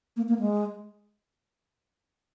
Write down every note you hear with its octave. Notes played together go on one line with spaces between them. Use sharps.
A#3
A#3
G#3